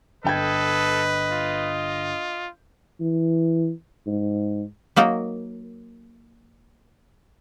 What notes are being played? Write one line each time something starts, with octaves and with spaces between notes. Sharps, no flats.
G1 A4 B4 D#5 G5 G#6
F4
E3
G#2
F#3 A#3 D#4 A#4